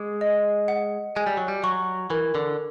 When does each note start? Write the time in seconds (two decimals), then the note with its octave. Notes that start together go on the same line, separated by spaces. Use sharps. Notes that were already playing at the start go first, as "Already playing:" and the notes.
Already playing: G#3 D6
0.21 D#5
0.68 F#5
1.16 G#3 G#5
1.26 G3
1.37 F#3
1.48 G3
1.64 F#3 C#6
2.10 E3 A#4
2.35 D3